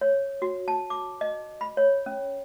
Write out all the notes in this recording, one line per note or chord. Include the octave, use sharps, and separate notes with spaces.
C#5
F#4
A5
D6
D#5
B5
C#5
C#4